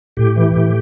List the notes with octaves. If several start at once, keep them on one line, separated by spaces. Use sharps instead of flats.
A2 G4
E3
A2